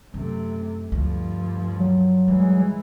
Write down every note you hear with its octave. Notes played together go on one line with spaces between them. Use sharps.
F#2 C3 A3
D2 G2 F3
F#3
E3 G3 G#3